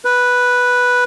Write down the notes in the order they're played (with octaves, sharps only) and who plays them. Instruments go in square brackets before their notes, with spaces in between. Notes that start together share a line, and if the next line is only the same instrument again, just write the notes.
[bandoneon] B4